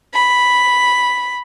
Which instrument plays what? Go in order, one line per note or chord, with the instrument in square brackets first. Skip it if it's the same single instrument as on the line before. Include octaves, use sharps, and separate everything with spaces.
[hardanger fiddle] B5